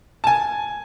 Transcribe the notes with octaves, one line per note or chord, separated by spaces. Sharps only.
A5
G#5